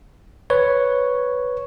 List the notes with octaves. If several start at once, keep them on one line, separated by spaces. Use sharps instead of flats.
B4 C#5